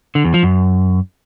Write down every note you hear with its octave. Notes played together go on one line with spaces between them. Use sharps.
D3
E2
F3
F#2